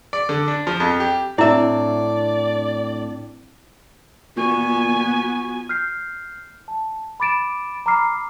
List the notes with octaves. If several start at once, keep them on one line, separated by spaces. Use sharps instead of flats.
D5
D3
D4
F3
F2
G4
A2 C4 D4 E4 D5 E5
A#2 B3 F4 F#4 G#5 C#6
F6 G6 C7
A5
B5 D6 A6 D7 E7
A#5 B5 D6 F6 C7